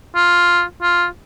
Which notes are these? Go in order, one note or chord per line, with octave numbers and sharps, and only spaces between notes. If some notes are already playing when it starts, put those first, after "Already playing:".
F4
F4